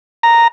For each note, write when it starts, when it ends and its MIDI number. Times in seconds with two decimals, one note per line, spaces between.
0.23 0.48 82